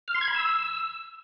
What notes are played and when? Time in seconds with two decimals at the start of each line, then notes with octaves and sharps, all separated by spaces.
0.08 F6
0.14 C6
0.21 G#6
0.28 B5
0.35 E6